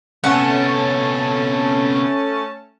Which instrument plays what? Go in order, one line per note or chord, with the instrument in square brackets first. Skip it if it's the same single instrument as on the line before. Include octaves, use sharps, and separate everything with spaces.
[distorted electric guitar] C3 B3 [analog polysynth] A3 C#4 A5 [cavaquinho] F#5